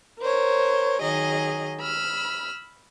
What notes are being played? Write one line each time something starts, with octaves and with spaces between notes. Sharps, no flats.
A#4 C5 C#5
D#3 F#3 G#4 D#5
B5 E6 F6